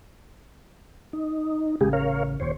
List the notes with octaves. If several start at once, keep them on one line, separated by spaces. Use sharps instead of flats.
D#4
A1 C#3 G#3 G4 G#4
A#4 C#5 F5
D#1 D#2 C5 C#5